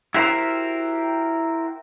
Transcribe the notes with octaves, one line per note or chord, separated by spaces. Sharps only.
E4 F#4 G4 A#4 C5